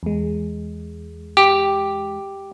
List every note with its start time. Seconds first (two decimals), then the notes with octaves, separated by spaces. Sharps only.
0.03 E2 G#3
1.37 G4